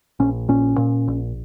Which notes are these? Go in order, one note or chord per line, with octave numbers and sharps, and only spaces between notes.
A#1 C#4
A#2 C#4
A#2
A#1